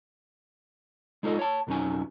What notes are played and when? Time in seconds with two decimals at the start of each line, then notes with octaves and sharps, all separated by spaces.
1.23 G#3 D#4 F4 A4 C5 D#5
1.39 C#5 A5
1.67 B1 F2 F#3 C#4 D#4 G#5